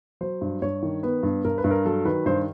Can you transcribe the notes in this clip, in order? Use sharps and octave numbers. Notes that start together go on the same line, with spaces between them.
F#3 C5
G2
G2 C#5
D#3
B3 B4
G2
G2 A#4
B4
G2
A#4
F#3 A4
D#3 B4
G2 C5